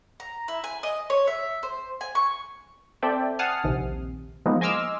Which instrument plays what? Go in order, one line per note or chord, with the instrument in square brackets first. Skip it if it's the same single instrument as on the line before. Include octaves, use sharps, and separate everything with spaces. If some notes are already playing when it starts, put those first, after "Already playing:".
[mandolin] A#5
E4
G#5
D#5
C#5
E5
C5
G#5
C#6
[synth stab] C4 A4 D5 E5 G5
F#5 G#5 A5 D#6 F6 C7
A#1 D#2 C3
F3 G#3 A#3 B3 D#4
D#5 G#5 C6 D6 E6 F6